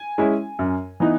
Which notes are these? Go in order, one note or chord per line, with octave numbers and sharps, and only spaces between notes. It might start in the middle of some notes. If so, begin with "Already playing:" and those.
Already playing: G#5
G#3 C#4 E4
F#2
E3 B3 D#4